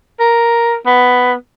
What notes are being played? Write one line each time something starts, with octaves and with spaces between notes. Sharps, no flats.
A#4
B3